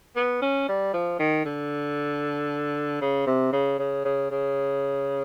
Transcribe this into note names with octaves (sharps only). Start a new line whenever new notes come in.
B3
C#4
G3
F3
D#3
D3
C#3
C3
C#3
C#3
C#3
C#3